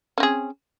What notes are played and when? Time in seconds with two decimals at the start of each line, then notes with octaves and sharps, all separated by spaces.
0.18 C#4
0.20 C4
0.23 G#4